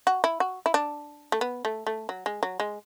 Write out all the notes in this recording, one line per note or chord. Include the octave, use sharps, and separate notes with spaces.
F#4
E4
F#4
E4
D4
A3
B3
A3
A3
F#3
G#3
F#3
G#3